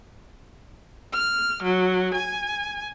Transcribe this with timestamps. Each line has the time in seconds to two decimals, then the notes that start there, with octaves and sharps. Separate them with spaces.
1.13 F6
1.63 F#3
2.13 G#5